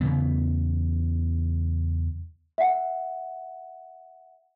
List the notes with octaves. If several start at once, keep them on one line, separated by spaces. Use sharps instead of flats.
E2 C#3 E3 B3
E5 F#5